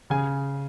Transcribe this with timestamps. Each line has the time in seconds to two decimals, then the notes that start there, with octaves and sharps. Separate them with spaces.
0.10 C#3 G#4 G#5